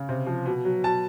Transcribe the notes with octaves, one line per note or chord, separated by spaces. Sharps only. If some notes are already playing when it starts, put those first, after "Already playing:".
Already playing: C#3
C3
F3
B2
F#3
B2 A5